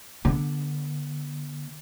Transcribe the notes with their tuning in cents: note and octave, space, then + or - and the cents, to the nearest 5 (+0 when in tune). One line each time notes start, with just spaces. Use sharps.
D3 +0 B3 -35